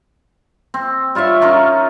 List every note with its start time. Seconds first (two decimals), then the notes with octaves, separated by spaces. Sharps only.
0.74 C4
1.15 G3 F4 C#5 E5
1.42 C#4 D#4 F4 A#4